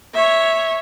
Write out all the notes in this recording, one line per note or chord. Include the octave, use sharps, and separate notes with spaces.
C#5 E5